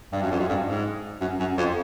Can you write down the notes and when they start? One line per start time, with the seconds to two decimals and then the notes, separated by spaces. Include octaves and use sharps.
0.13 G2
0.22 F#2
0.31 F2
0.39 F#2
0.49 G2
0.67 G#2
1.21 F#2
1.40 F#2
1.58 F2